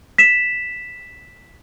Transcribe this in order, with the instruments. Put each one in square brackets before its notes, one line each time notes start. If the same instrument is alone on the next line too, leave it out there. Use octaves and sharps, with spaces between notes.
[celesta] B6 E7